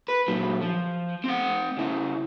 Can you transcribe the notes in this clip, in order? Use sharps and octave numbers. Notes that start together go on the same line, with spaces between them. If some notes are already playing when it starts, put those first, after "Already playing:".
B4
A#2 F#3
F3
C4 F#5
C#3 E4